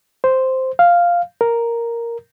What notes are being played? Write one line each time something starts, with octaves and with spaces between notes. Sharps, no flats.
C5
F5
A#4